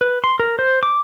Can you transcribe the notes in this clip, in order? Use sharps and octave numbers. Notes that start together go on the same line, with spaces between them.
B4
C6
A#4
C5
D6